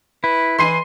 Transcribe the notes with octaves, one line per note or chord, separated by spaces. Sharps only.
E4 B4
E3 C6 C7 D#7